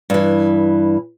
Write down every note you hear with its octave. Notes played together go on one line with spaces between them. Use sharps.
G2 E3